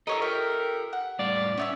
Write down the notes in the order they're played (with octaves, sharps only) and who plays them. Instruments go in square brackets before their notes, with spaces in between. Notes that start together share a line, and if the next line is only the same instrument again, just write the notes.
[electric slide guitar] G4 A4 [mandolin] A#4 C#5 E6 [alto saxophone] D#5
[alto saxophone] A#4 [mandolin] E5 G5
[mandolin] F#5
[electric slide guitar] A2 G3 F5 [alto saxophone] D5
[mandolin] B3 E5 E6 [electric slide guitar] C#4